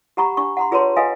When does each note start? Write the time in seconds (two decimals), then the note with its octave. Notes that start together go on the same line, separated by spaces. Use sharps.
0.17 G4 F#5 A#5 B5 C#6
0.37 D4 C#6
0.57 F#5 A#5 C6
0.71 F4 G#4 B4 C#5 A5 C6
0.96 A4 B4 D#5 F5 F#5 G#5